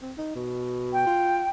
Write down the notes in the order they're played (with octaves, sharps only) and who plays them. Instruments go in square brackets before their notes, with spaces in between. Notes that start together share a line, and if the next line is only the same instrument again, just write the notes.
[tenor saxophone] C4
D#4
B2
[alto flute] G5
[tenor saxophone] F4